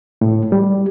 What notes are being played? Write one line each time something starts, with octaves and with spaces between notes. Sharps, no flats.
A2
G3